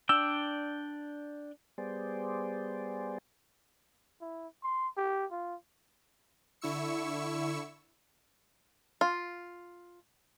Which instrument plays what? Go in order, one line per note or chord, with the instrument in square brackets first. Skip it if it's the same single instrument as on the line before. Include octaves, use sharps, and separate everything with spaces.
[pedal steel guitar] D4 D5 G5 [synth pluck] E6
[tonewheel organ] G3 B3 G#4 C5 D5
[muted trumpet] E4
C6
G4
F4
[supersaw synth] D3 E4 C#6 E6 C#7
[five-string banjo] F4